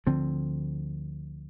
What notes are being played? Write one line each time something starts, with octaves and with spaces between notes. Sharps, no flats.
D2 D3 F3 C4